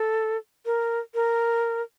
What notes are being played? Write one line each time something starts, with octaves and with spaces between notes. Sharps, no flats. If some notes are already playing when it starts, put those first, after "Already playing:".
Already playing: A4
A#4
A#4